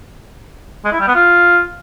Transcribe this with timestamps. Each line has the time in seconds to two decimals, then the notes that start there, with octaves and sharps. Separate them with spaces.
0.85 G#3
0.92 E4
1.00 G3
1.07 B3
1.15 F4